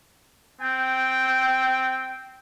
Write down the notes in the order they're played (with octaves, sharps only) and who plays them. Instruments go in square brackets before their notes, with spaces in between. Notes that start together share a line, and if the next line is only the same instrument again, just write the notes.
[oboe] C4 [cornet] G5